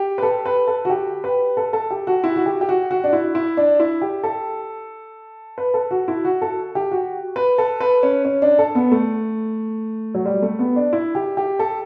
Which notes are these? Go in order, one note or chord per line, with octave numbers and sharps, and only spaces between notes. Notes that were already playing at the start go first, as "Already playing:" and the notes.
Already playing: G4
B4
A4
B4
A4
F#4
G4
B4
A4
A4
G4
F#4
E4
F#4
G4
G4
F#4
F#4
D4
E4
E4
D4
E4
G4
A4
B4
A4
F#4
E4
F#4
A4
G4
F#4
B4
A4
B4
C#4
C#4
D4
A4
B3
A3
F#3
G3
A3
B3
D4
E4
G4
G4
A4